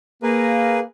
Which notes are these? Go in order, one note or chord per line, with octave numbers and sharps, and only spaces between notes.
A#3 G#4 A#4 B4